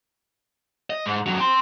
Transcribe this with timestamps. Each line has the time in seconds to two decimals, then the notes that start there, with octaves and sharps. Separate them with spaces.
0.90 D#5
1.06 G#2
1.26 F2 F#3
1.39 G5 C6